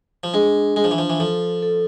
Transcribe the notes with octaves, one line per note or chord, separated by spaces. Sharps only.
F3
G#3 D4
G#3 D4
F3
E3
F3
E3
F3 A4
A4